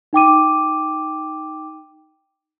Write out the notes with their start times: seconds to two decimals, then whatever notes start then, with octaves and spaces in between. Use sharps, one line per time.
0.13 D#4 G5 D6 D#7